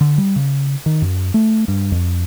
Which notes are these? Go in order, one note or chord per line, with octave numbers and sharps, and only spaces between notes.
D3
G3
C#3
D#3
F#2
A3
G2
F2